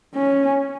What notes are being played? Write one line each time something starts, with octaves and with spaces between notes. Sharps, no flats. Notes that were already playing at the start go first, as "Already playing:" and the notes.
C#4